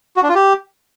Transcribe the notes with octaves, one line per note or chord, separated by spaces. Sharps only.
F#4
D4
F4
G4